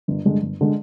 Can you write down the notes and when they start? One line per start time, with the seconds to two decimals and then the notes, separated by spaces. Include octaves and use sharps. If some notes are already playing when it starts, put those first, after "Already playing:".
0.08 G1
0.25 G2 D3 G#3
0.42 G1
0.61 D3 G#3